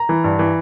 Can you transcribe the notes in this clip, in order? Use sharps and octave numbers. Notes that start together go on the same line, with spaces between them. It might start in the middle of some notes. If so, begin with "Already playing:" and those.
Already playing: A#5
E3
G2
E3